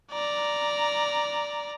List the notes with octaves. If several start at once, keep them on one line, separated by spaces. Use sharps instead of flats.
D5 A#5